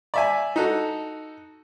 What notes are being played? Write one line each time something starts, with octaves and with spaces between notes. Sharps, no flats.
D5 E5 G#5
D#4 F#4 A4